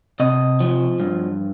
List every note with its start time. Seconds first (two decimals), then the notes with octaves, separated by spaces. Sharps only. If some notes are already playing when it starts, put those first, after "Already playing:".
0.20 C3 D#5
0.60 F3
1.00 G2